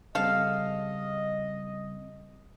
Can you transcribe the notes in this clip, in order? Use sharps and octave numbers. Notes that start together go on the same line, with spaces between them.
C#3 G3 C4 A4 D#5 F5